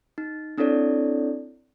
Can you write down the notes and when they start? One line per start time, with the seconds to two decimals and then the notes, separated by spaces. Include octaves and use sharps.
0.18 D#4
0.58 C4 D4 E4 A4 C#5 D5